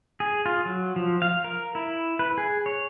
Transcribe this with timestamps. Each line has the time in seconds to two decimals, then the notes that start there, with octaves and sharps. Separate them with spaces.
0.20 G#4
0.46 F4
0.65 F#3
0.96 F3
1.22 F5
1.44 A#4
1.75 E4
2.19 B4
2.38 G#4
2.66 C#5